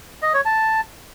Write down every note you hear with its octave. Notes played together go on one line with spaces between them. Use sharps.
D#5
C#5
A5